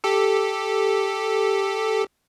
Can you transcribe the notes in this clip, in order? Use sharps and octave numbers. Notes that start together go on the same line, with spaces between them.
G4 A4